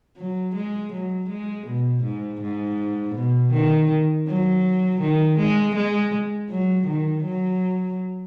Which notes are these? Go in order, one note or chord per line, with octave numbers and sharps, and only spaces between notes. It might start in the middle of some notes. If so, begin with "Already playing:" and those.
F#3
G#3
F#3
G#3
B2
G#2
G#2
B2
D#3
F#3
D#3
G#3
G#3
F#3
D#3
F#3